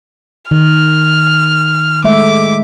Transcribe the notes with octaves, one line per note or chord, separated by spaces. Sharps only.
D#3 F6
G#3 A3 E5 D6